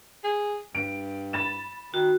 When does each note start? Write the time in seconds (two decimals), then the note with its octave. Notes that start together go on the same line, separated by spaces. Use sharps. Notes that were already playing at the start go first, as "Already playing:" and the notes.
0.24 G#4
0.75 G2 D7
1.33 B5 A6 E7
1.94 D#3 F#4